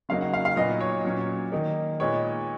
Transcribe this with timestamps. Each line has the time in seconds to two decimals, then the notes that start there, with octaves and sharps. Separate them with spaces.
0.09 C#3 F#3 A#3 D#4 F5
0.21 F#5
0.33 F5
0.45 F5
0.56 A#2 F#3 B3 D#4 D#5
0.81 C#5
1.05 A#2 F#3 C#4
1.52 D#3 A#3 D#4
2.00 A#2 G#3 B3 D#4 C#5